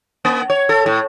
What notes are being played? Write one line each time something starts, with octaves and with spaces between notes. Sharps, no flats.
A#3
C#5
A4
A2